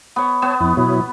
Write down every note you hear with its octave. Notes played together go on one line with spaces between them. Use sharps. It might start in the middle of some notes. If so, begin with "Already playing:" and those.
B3 C#5
B3 C#5 A5
F2 E4
B2 F#3 E4